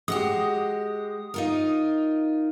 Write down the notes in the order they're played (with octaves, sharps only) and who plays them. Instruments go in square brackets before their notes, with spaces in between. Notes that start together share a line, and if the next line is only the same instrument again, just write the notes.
[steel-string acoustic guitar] G#3 F#4 G4 [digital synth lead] D#6
[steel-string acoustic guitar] D#4 F4 A#4